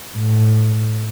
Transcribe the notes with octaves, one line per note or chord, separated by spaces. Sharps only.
A2